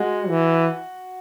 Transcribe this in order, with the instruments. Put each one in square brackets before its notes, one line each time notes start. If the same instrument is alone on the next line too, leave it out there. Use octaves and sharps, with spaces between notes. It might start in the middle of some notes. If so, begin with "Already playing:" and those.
Already playing: [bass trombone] G#3 [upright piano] F#4
[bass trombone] E3